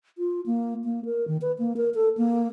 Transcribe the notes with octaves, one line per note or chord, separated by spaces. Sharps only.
F4
A#3
A#3
A#4
D#3
B4
A#3
A#4
A4
A#3